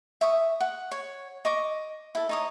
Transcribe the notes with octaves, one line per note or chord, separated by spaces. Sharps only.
E5 C#6 D#6
F#5
C#5
D#5 C#6 D6
E4 A4
D#4 C#5 D#6